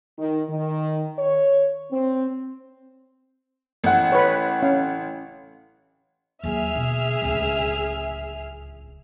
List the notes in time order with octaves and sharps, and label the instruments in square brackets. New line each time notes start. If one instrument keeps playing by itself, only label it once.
[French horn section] D#3
D#3
C#5
C4
[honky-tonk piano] A1 F#5
[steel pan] B4 C#5
C#4 F5
[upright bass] D#2 F#3 [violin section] G#4 E5 F6
[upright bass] B2 D3
D1 C#2